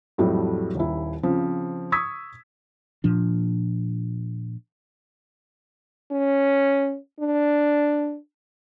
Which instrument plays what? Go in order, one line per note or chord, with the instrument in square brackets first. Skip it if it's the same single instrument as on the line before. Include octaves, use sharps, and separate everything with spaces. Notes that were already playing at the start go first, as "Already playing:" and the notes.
[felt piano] F2 A2 F#3 G3 A3
D#1 D#2 E4
C#3 F3 C4
C#6 D#6 E6 G#6 B6
[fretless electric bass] A#2 F3 D4
[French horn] C#4
D4